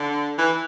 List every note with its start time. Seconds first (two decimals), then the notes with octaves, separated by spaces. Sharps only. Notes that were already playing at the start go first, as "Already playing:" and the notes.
Already playing: D3
0.38 E3